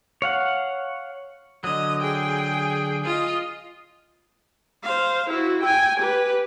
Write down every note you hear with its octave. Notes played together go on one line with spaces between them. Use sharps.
C#5 F5 F#5
D3 F#3 D#5
G#4 G5
F4 D#5
C5 F5
E4 F#4
G5 G#5
G4 B4